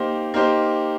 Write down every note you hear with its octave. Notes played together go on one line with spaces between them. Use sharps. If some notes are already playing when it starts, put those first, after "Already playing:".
Already playing: A#3 D#4 G4 C5
A#3 D#4 G4 C5